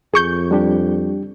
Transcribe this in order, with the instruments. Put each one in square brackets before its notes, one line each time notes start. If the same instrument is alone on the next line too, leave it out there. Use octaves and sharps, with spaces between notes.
[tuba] F2 [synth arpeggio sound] G#4 C#6 G6
[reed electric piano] G3 D4 G4